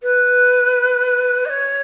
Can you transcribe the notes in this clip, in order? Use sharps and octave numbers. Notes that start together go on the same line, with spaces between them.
B4
D#5
C#5